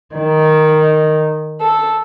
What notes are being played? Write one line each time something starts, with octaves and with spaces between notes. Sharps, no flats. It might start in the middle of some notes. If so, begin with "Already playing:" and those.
D#3
A4